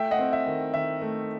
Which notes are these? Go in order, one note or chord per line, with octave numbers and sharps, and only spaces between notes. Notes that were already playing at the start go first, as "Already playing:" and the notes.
Already playing: A3 E5 G5
D#5 F#5
C4
E5
D#3
D#3 E5
A3